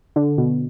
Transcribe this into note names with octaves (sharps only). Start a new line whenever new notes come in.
D3
B2